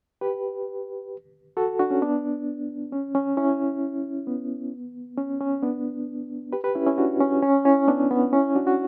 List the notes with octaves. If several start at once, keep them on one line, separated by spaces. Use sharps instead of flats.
G4 B4
F#4 A4
D4 F#4
C#4
B3 D4
C#4
C#4
C#4 E4
B3
C#4
C#4
B3 D4
G4 B4
G4 B4
C#4 E4
C#4 E4
D4 F#4
C#4
C#4
C#4 E4
B3 D4
B3
C#4 E4
D4 F#4
F#4